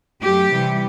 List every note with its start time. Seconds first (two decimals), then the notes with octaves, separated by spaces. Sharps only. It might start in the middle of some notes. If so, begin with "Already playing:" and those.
0.21 F#2 F#3 A3 G4
0.50 C3 E3 G3